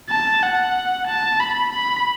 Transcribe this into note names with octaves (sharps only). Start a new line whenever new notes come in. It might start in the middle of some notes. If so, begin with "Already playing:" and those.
A5
F#5
A5
B5
B5